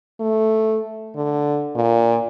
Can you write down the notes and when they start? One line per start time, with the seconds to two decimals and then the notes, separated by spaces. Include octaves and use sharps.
0.20 A3
1.16 D3
1.76 A#2